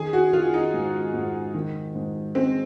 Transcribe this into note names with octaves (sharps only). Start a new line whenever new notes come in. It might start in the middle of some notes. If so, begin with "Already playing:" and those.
Already playing: D#3 G#4
F#4
D#3 F4
D#4
G#2
G#2
D#3
G#2
G#3 C4